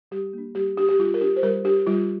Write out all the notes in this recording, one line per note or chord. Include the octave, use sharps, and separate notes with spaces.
G3 G4
A#3 D4
G3 G4
D4 G4
G4
G3 F4
A#4
D4 G4
C5
G3 A#4
D4 G4
G3 F4